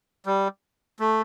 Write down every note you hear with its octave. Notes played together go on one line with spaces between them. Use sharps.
G3
A3